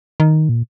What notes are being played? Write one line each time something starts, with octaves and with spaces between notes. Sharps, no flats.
D#3
A#2